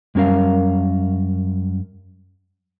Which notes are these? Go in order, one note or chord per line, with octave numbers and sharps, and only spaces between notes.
F#2 G3 C#4 A#4 F5